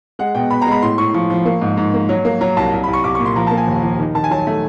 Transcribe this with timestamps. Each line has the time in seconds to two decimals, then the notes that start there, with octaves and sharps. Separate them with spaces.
0.19 G#3 F#5
0.35 B2 G5
0.50 B2 B5
0.62 A#5
0.67 G#3 B5
0.82 A2 C6
0.98 A2 C#6
1.14 F3 C#6
1.30 F3
1.45 A#3
1.61 G#2
1.77 G#2
1.94 A#3
2.09 F#3
2.25 A#3
2.41 F#3 A#5
2.57 C2 A5
2.73 C2
2.84 C2 B5
2.93 C#6
3.04 C2 D6
3.15 A#2 C#6
3.26 C6
3.36 F3 A#5
3.47 A#3 A5
3.57 G#5
3.68 D#2
3.83 F3
3.99 D#3
4.15 D#3 A5
4.24 G#5
4.31 F#3 A5
4.47 A3